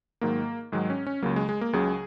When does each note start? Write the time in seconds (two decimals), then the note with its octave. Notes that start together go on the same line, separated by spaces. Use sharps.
0.21 G#2 D#3 F#3 A#3
0.72 G#2 D#3 F#3 G#3
0.90 C#4
1.07 C#4
1.22 C#2 C#3 F#3 A#3
1.36 G#3
1.49 G#3
1.61 A#3
1.73 C#2 C#3 F#3 G#4